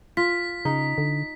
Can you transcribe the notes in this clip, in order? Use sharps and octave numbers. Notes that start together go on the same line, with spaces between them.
F4 B6
C#3 D#4
D3